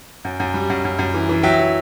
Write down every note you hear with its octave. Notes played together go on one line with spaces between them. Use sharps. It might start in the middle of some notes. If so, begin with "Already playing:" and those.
F#2
F#2
G3
F#2
F#2
F#2
E3
E3
F#3 E5 G5
F#3